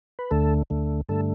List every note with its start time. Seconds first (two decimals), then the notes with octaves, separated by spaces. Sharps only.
0.19 B4
0.31 D2 D3 A3 A4
0.70 D2 D3 A3
1.09 G2 D3 A3 A4